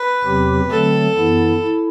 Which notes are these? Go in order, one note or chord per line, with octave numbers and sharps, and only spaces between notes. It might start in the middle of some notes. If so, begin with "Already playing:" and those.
Already playing: B4
E2 C3 F#3 C4 G4
D3 F#3 A3 C4 A4
F#2 E3 B3 E4
E4